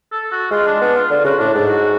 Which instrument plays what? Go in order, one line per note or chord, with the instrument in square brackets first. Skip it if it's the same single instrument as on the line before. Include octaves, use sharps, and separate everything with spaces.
[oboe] A4
F#4
[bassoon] G#3 [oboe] F4
[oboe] D4
[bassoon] B3 [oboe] D4
[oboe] F4
[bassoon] D3 [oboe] F4
[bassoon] C#3 [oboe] F#4
[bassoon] A2 [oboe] D4
[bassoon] G#2 [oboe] D4
[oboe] F#4